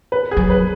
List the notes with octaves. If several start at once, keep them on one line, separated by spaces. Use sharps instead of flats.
B4
G#4
F#3
B4